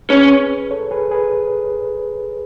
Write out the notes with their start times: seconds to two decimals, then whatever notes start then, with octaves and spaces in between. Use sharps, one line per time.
0.09 C#4 G#4 B4
0.71 A4 C#5
0.91 G#4 B4
1.11 G#4 B4